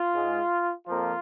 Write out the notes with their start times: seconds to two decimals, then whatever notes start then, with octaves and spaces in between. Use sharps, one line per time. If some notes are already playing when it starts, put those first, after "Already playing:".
Already playing: F4
0.14 G#2 G#3
0.87 F2 F3 A#3 F4